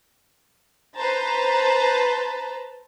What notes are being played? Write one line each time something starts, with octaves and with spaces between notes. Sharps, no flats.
B4 C5 A5 A#5